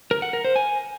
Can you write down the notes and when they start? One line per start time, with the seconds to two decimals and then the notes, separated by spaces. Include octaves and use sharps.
0.11 A#4
0.22 F#5
0.33 A#4
0.44 C5
0.56 G#5